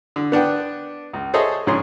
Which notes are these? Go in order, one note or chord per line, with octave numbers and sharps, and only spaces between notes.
D3
B3 D4 F#5 G5
C#2
G#4 A4 C5 C#5 D#5 E5
A#1 G#2 C#3 G#4 C#5 C6